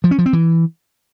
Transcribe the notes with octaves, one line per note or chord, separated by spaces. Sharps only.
F3
C#4
F3
C4
E3